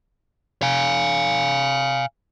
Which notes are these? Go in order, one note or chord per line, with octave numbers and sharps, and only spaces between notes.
F5 G#5